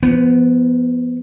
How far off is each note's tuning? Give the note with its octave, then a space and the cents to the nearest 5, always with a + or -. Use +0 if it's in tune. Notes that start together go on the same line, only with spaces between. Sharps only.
F3 -30 B3 +0